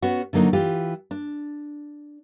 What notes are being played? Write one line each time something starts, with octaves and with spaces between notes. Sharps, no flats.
B3 C#4 F#4
D3 F#3 A#3 D#4
E3 F4 G4
D4